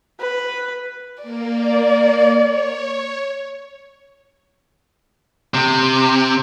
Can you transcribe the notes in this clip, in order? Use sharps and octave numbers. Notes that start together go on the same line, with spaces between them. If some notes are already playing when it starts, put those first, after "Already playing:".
B4
A#3 D5
C#5
C3